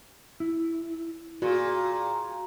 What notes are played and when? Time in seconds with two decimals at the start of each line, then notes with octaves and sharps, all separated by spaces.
0.40 E4
1.42 A#2 F#4 G#4